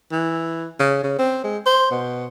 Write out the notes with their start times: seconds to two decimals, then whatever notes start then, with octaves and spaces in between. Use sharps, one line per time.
0.12 E3
0.80 C#3
1.03 C#3
1.19 C4
1.44 G#3
1.66 C5
1.91 B2